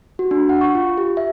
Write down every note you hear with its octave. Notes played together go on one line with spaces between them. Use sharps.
F#4
D4
F#5
C#6
F4
G4
E5